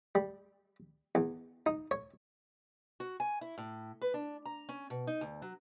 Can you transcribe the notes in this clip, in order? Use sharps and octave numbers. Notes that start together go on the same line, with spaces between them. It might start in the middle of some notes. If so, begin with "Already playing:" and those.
G3
E2
D#4
C#5
F#4
G#5
E4
A2
B4
D4
A#5
C#4
B2
D#4
D2
F#3